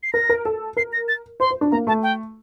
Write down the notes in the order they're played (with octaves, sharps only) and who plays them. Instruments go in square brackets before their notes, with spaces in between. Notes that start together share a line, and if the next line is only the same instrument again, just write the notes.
[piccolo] C7
[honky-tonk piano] A#4 [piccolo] A#6
[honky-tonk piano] A#4
A4
[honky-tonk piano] A#4 [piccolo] C7
[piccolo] A#6
A6
[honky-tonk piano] C5 [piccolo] C6
[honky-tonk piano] C5
D4
[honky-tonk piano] A#3 [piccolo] A#5
[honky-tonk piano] A3 [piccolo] A5
[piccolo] G5